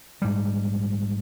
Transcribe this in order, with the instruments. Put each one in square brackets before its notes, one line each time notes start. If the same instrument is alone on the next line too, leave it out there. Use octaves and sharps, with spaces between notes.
[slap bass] A#1 G#2 G3